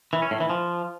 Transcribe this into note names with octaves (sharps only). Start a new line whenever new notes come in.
E3
C#4
A2
E3
F3